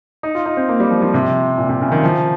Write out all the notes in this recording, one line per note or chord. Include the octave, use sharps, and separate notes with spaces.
D#4
F4
D#4
C4
A#3
G3
F3
F3
C3
A#2
C3
C#3
D#3
F3